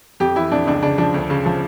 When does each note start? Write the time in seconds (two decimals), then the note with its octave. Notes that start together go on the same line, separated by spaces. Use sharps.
0.20 F2 G4
0.36 E3 E4
0.52 F2 D4
0.67 C#2 D4
0.82 C#3 D4
0.98 F3 D4
1.14 D2
1.30 C#3
1.46 F3